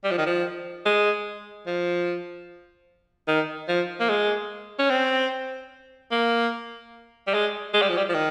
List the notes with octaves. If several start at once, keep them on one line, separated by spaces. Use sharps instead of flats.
G3
F3
D#3
F3
G#3
F3
D#3
F3
A#3
G#3
C#4
C4
A#3
G3
G#3
G#3
G3
F3
G3
F3
D#3